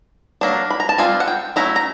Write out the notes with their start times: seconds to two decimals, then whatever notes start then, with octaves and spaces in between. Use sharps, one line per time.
0.41 F#3 A#3 D4
0.70 B5
0.80 A#5
0.89 A5
0.98 G3 C4 F4 G#5
1.20 F#5
1.28 G5
1.56 F#3 A3 C#4 E4 A#5
1.76 A#5